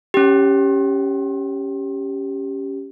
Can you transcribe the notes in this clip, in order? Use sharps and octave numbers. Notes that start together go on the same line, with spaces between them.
C#4 G4